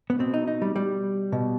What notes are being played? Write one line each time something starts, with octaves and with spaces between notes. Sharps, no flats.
B3
B2 C4
D#4
D#4
G3
G3
B2